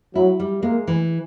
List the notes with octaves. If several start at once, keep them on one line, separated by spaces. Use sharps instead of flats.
F#3 E4
G3
G#3 A#3
E3